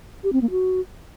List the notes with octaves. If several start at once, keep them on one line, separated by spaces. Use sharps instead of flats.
G4
C4
A#3
F#4